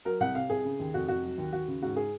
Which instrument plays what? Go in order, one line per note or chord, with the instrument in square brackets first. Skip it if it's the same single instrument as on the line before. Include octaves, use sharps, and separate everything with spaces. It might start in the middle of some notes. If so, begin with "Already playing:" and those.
[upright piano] F#3 A#4
C2 F#5
C3 F5
C2 G#4
C#3
D#2
F1 F#4
F1 F#4
F#3
D#2
D#2 F#4
C#3
G#2 F#4
G#4